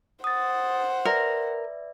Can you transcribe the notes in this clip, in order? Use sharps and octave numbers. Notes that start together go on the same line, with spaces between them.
C5 F#5 D#6 A6
A#4 B4 D5 E5